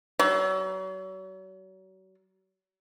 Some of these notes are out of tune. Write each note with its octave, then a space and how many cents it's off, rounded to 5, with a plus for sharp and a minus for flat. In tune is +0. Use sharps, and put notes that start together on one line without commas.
F#3 +35